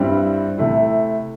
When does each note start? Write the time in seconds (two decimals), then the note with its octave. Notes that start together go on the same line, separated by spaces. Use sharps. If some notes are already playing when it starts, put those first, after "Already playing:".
Already playing: G2 G3 C4 E4
0.58 C3 A3 E4